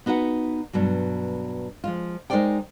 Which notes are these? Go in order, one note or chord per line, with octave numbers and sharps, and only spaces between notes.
B3 D#4 F#4 B4 F#5
G2 B2 F#3
F3 G#3 F4
G#3 D#4 A#4 C5 D5 G5